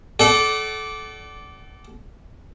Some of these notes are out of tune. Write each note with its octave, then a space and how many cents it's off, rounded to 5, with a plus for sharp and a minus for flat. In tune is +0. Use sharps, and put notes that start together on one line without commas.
A4 -25 D5 -10 F#5 +35